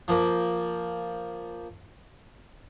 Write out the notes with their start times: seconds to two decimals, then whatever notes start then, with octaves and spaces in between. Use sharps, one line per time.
0.08 F3 A#3